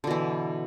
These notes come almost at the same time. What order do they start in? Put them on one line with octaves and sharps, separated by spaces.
D3 B2 E3